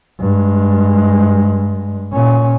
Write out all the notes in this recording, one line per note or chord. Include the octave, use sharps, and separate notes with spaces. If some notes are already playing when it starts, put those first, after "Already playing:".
G2 G#3
A#2 C#4